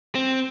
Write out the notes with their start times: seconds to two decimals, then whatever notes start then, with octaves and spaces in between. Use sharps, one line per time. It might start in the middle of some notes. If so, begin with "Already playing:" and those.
0.15 C4